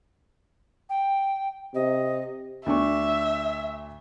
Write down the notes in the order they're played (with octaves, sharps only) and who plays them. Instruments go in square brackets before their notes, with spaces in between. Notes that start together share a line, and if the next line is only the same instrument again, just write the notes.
[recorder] G5
[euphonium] C3 [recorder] D#5
[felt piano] D2 D4 C#6 [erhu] E5